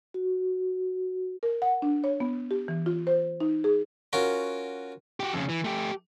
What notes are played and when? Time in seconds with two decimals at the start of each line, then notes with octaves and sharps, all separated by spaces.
0.14 F#4
1.43 A#4
1.62 F#5
1.82 D4
2.04 C#5
2.20 B3
2.51 G4
2.68 E3
2.86 F4
3.07 C5
3.40 D#4
3.64 G#4
4.13 C#4 F4 F#4 A#4
5.20 F#4 G4
5.33 F2 C#3
5.49 E3
5.65 A3 G4